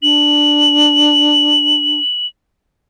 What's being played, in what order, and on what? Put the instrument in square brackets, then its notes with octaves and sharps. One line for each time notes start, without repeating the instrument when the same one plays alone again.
[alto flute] D4 [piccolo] F#7